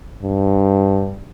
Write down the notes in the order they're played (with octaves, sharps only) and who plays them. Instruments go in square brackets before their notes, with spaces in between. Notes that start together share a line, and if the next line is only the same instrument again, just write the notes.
[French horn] G2